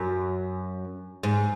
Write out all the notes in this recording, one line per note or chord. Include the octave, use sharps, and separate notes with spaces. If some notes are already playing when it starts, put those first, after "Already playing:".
Already playing: F#2
G#2